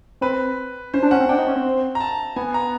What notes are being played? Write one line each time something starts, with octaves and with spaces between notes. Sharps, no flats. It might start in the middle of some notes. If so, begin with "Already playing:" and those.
C4 B4
C#4 C5
D4
C#4 F#5
C4
D4 G5
D#4
C#4
C4
A#5
A5
B3 G#5
A#5